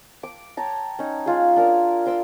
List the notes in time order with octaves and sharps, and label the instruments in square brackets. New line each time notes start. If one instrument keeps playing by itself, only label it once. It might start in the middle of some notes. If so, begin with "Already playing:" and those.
[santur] D6
C#5 G5 A5 A#5
C#4 D#4
G#3 F4 G#4
D4 A#4 A#5
A#5 C6 D6 E6